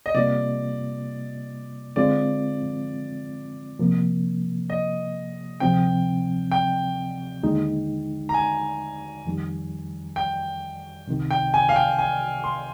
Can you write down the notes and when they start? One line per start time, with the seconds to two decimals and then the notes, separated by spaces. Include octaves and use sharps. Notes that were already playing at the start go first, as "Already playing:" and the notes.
0.06 D#5
0.15 C3 G3 A#3 F4 D5
1.96 D3 G#3 C4 F4 D5
3.79 C3 F3 A#3
4.70 D#5
5.60 D2 C3 F3 C4 G5
6.52 G5
7.43 D#2 D3 G#3 D#4
8.29 A#5
8.34 G#5
9.25 F2 D#3 G3
10.16 G5
11.07 C2 C3 D#3
11.31 G5
11.54 G#5
11.69 F5
11.76 G5
11.98 G#5
12.44 C6